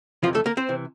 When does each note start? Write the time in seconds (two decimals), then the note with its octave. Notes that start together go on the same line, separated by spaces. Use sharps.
0.23 F2 C3 E3 F3 F4
0.35 A3 A4
0.46 A#3 A#4
0.57 C4 C5
0.69 C3 E3